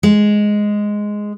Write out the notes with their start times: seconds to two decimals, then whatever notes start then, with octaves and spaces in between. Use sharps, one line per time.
0.03 G#3